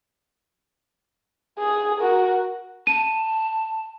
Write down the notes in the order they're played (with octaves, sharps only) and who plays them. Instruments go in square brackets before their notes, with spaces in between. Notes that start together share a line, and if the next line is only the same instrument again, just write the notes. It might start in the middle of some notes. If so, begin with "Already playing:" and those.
[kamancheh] G#4
F#4 A#4
[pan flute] A5 [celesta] D#7